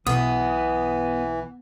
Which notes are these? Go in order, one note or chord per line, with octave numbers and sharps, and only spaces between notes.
B1 B2 E3 B3 D#6